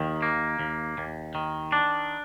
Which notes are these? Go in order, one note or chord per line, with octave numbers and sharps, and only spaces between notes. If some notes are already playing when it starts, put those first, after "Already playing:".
Already playing: D#2 D#3
A#3
D#2
D#2
D#3
D4